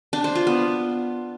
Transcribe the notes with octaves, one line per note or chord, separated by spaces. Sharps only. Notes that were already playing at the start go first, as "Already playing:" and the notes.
D4
C5
F4
B3